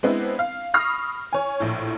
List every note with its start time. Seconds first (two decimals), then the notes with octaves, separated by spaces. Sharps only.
0.03 G#3 B3 C4 D4 E4
0.39 F5
0.74 B5 C#6 D#6 F6 A#6 C7
1.33 C#5 G#5
1.60 A#1 A2